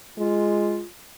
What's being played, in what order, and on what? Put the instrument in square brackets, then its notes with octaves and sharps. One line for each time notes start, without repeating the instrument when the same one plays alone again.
[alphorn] G#3 [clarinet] F4